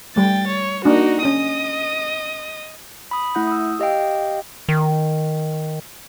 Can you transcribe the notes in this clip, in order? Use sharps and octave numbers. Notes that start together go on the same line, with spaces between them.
G3 A3 G5 A6
C#5
A#3 D4 D#4 F#4
C#4 D#5 D#6
B5 D#6
A3 E4 F#5 G6
D#6 E6
G4 D#5 F5 G5
D#3